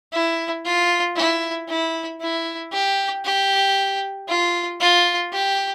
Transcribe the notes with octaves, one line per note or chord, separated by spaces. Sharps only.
E4
F4
E4
E4
E4
G4
G4
F4
F4
G4